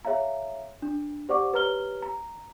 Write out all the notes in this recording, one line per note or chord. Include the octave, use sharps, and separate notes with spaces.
G#4 C#5 E5 F5 A#5
D4
G4 C5 D5 F#5 C#6 D6
G4 B4 C#5 A#5 F6 G7
A#5